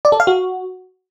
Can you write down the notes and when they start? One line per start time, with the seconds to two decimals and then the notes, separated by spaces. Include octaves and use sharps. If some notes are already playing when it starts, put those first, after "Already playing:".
0.05 D5
0.12 A4
0.20 F5
0.27 F#4